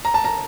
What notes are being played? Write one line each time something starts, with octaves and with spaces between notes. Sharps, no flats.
A#5
A5
A#5